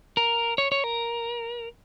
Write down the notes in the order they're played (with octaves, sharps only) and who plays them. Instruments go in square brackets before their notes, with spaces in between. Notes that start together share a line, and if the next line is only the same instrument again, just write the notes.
[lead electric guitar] A#4
C#5
C#5
A#4